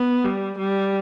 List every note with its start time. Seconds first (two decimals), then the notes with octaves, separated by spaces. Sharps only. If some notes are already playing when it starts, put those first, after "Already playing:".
Already playing: B3
0.24 G3
0.58 G3